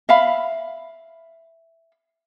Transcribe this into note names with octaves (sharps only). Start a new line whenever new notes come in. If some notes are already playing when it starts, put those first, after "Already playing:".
E5 F5 B5